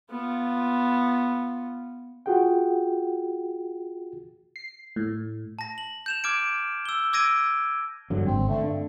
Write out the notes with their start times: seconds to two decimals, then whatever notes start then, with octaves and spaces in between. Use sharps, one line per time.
0.10 B3 F4
2.26 F4 F#4 G#4 F#5 G5
4.56 C7
4.96 A2
5.59 A5 A#6
5.78 F#7
6.06 G6 E7 F7
6.24 D6 F6 G#6 D7
6.86 E6 G7
7.13 D6 E6 G#6 A#6 D7 D#7
8.10 G2 D3 F#3
8.26 G#1 C4
8.48 D3 A3
8.63 G2